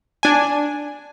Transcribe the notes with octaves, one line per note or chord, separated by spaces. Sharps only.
D4 G#5